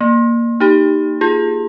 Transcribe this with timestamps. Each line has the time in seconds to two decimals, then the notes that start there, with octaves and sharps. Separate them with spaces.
0.01 A#3
0.60 D#4 G4
1.21 F4 G#4